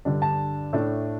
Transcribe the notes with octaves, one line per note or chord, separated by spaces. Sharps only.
G2 D3 G3 D4
A5
A2 A3 D4